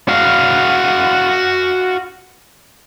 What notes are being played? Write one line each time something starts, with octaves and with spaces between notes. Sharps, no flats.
F#4 F5